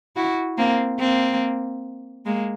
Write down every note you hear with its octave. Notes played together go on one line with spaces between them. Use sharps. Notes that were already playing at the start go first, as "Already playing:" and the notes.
E4 F#4
A#3 C4
A#3 C4
G#3 A#3